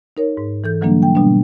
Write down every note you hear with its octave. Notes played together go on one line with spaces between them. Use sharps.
D#4 A#4 C#5
G#2
E3 A4 G6
D3 E3 F#3 G3 A#3 D4
G5
B2 G3 B3 D4